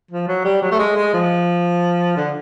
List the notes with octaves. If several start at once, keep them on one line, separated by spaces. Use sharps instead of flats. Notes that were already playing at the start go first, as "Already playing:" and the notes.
F3
F#3
G3
F#3
A3
G#3
G#3
F3
D3